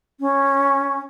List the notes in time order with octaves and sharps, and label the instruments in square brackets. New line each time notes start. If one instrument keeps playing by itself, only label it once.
[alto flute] C#4